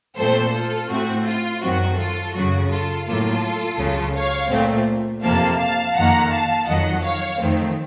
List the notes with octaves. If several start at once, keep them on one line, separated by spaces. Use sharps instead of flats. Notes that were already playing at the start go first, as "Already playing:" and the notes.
A#2 A3 C4 A4 C5
F4 A4
A2 A3 C4 F#4
F4
F#2 D#3 F#3 C4 F#4
F4 A4
F#2 C#3 F#3 F#4
F4 A4
A2 F#3 A#3 F4 A4
C#2 C#3 F#3
C#5 F5
A#2 A3 C4
F2 C3 F3 A#3 F5 A5
F5 A5
F2 D#3 A#3 F#5 A#5
F5 A5
F2 D#3 F#3 D#5 F#5
C#5 F5
F2 D#3 A3 C4